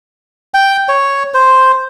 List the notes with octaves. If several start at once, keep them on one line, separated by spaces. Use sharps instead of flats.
G5
C#5
C5